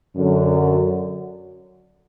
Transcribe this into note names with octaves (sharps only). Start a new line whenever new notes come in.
F#2 D3 F#3